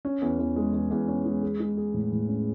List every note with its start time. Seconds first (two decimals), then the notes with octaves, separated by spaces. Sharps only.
0.05 C#4
0.22 E2
0.39 E2
0.56 G#3
0.73 E2
0.91 E2
1.08 C#4
1.26 G#3
1.43 G#4
1.60 G#3
1.77 G#4
1.94 A2
2.12 A2
2.29 C#4